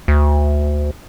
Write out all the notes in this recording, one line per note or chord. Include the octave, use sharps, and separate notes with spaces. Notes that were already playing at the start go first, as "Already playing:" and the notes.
D2